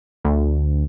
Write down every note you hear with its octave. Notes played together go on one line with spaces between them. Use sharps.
D2